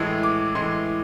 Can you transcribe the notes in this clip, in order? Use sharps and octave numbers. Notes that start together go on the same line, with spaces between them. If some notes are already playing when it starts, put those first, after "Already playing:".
Already playing: A2 E3 G#3
D6
A2 E3 G#3 C6